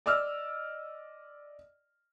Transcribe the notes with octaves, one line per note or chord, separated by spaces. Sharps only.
D5 D#5 D6 E6 F6